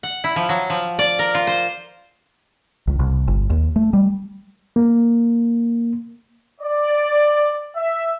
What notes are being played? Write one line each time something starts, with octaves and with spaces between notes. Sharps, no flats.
F#5
E4
F3
F#3
F3
D5
A#4
F4
C5
C#2
C2
G1
D#2
A3
G3
A#3
D5
E5